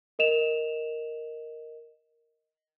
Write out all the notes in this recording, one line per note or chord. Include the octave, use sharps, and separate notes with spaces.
A#4 D#5 E7 F7